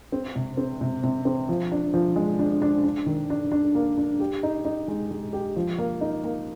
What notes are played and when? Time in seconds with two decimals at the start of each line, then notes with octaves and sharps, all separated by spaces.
0.12 C4
0.36 C3
0.57 C4
0.81 C3
1.04 C3
1.25 C4
1.49 F3
1.72 D4
1.94 F3
2.16 G#3
2.39 D4
2.62 D4
2.84 D4
3.06 D#3
3.30 D4
3.52 D4
3.75 A#3
3.98 D4
4.20 G4
4.43 D#4
4.65 D#4
4.88 G#3
5.11 G#3
5.33 G4
5.56 F3
5.78 A#3
6.01 D#4
6.24 A#3